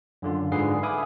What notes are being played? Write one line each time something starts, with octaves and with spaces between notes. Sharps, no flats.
F#2 D3 F4
G#2 D3 G#4 B4 C7
E5 F5 G#5 B5 D6 D#6